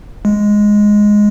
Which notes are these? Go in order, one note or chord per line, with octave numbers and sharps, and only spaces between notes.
G#3